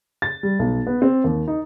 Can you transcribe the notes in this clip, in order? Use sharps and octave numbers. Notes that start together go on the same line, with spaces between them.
A6
G3
B1
B3
C4
D#2
D#4